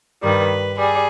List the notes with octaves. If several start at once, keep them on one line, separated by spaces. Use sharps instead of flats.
G2 D#3 G3 B4
G3 G#4